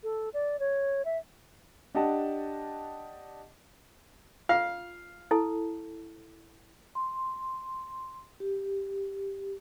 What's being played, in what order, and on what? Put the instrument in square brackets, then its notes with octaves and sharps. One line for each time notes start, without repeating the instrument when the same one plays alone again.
[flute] A4
D5
C#5
E5
[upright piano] D4 G4 D#5 F#5 A5
[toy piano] F4 [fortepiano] F5
[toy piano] E4 A4 A5
[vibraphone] C6
G4